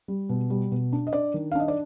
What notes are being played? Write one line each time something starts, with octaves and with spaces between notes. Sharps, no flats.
G3
B2
G3
B2
D4
D#5
D4 D5
D#3
F5
D4 D#5
D5